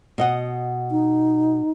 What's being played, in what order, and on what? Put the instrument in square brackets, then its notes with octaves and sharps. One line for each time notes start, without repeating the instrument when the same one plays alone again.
[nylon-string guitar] B2 D#5 F#5
[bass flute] D#4